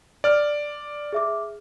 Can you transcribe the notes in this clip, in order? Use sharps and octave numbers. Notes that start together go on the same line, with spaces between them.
D5 F6
G#4 E5 D6